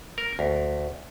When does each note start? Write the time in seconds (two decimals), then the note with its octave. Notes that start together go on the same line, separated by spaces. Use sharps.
0.18 A#4
0.39 D2